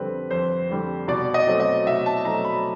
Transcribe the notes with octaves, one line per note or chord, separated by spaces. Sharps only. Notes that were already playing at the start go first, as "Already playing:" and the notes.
Already playing: F2 D3 G3 C4 B4
F2 C5
D3 G3 C4
B2 D5
D#5
F#3 A3 C4
D#5
B2 E5
A5
F#3 A3 C4 A#5
B5